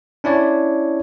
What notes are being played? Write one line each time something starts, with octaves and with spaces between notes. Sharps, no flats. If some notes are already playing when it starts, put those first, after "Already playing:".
C#4 D4 E4 C#5 D5